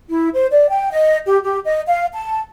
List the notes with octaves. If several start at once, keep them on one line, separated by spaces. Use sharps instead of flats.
E4
C5
D5
G5
D#5
G4
G4
D#5
F5
A5